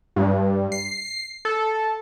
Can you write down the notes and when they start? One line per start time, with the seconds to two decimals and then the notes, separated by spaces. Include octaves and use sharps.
0.16 G2
0.72 C7
1.45 A4